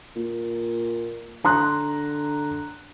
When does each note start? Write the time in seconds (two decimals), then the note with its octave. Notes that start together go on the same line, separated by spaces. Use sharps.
0.16 A#2
1.45 D3 A#5 C6 F#6